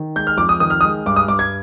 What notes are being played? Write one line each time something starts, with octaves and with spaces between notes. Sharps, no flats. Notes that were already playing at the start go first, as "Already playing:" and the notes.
Already playing: D#3
G#3 G6
F6
F2 D6
D#6
D#3 D#6
F6
D#6
G#3
G2 D6
D#6
G2 D6
G#6